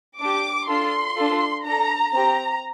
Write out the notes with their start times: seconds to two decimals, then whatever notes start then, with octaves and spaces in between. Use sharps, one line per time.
0.20 D4 G4 D6
0.68 D4 F4 A4 C6
1.17 D4 F4 A4
1.64 D4 A4 A#5
2.13 C4 G4 A#5